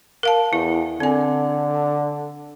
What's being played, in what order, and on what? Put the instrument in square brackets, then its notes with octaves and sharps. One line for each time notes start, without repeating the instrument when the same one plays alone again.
[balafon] A#4 F5 A5
[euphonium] E2 [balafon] E4
[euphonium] D3 [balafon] C4 G#5